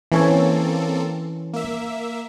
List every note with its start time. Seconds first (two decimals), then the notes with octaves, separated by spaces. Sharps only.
0.12 E3 A#3 C4 C#4 A4 C#5
1.54 A#3 E5